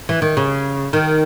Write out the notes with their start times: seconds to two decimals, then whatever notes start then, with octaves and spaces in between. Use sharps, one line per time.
0.09 E3
0.22 D#3
0.37 C#3
0.93 D#3